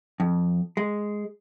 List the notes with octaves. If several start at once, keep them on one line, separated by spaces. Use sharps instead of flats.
F2
G#3